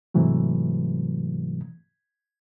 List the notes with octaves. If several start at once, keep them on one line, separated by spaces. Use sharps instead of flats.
G#2 C3 E3 F#3 A3